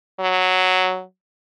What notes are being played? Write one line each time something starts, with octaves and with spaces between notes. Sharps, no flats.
F#3